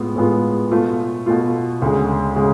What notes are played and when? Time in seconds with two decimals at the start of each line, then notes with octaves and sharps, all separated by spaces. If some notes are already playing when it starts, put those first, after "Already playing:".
Already playing: A2 G#3 B3 F4
0.16 A2 G#3 B3 F4
0.71 B2 A3 F4
1.26 B2 A3 F4
1.82 D2 C#3 G#3
2.36 C#3 G#3